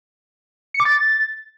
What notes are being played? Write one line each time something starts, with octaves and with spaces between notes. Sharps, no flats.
C#7
D6
A6